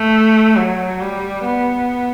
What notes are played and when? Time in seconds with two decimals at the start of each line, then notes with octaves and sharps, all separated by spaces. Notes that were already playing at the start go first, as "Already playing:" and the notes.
Already playing: A3
0.57 F#3
1.01 G3
1.45 B3